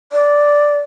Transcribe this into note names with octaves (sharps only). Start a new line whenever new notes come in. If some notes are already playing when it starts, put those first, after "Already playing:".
D5